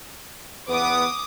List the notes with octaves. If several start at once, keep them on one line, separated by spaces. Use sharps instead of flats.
E2 B3 B4 D6 D#6